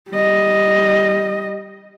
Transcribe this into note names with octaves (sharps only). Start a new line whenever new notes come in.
G3 D#5